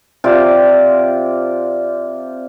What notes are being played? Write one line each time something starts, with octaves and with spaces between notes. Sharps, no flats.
C3 F4 D5